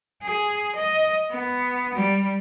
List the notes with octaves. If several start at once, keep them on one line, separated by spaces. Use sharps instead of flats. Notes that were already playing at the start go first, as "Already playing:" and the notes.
G#4
D#5
B3
G3